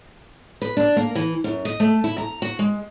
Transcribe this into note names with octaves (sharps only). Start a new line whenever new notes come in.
B4
D4
A#3
E3
F#2
D#5
A3
E4
A#5
F#4
G#3